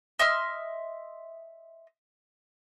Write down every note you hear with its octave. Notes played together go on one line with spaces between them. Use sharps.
D#5 E5 C6 F6